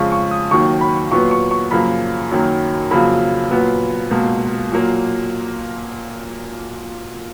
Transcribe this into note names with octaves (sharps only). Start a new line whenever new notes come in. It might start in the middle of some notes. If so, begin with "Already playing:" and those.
Already playing: F2 C#3 G#3 C#6
C#6
D#6
D#2 D#3 F#3 C#6
B5
A#2 F#3 B3 C#6
C#6
C#6
F#2 C#3 F3 A#3 B5
F#2 D#3 F#3 A#3
F2 C#3 F#3 A#3 B5
A#2 F#3 B3
C#2 B2 A#3
A#2 F#3 A#3